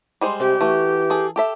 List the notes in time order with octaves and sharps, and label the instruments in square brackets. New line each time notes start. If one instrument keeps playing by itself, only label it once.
[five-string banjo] G3 G#3 C5
[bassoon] C3 [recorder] G4
[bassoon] E3 [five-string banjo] A3 F#4
[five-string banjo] G#4 A4
G4 A4 E5